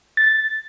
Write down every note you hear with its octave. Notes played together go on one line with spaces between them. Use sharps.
A6